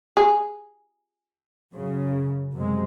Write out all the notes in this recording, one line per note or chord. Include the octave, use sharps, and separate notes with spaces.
G#4
F#2 C#3
F#2 C3 G#3